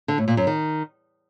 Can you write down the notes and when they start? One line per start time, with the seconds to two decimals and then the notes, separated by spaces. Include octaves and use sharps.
0.08 D3
0.18 A2
0.28 A#2
0.37 F#2
0.47 D#3